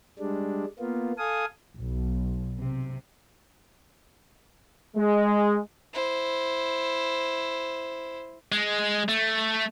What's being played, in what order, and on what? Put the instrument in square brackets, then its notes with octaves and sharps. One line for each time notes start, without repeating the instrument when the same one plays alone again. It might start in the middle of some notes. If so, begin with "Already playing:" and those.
[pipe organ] G3 G#3 D4
A#3 B3 F4
A4 F5 G#5 D#6
[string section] B1
C3
[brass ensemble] G#3
[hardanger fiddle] E4 C5
[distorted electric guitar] G#3
A3